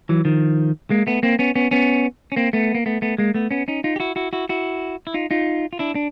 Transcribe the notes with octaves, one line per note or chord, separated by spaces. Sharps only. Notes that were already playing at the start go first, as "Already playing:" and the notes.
E3 F#3
D#3 F3
G#3 A#3
A3 B3
A#3 C4
B3 C#4
B3 C#4
B3 C#4
C#4
A#3 C4
A3 B3
A#3
A3 B3
A3 B3
G#3 A#3
A3 B3
B3 C#4
C#4 D#4
D#4 F4
G4
E4 F#4
E4 F#4
E4 F#4
E4 F#4
E4
D#4 F4
D#4 F4
F4
D4 E4
D4